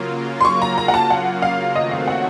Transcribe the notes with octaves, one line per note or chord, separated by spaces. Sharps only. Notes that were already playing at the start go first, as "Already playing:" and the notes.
Already playing: C#3 F#3 A#3 F4
C6
C#6
A#5
A#5
F#5
A5
F#5
F5
D#3 F#3 A3 C4 F#4 D#5
F5
F#5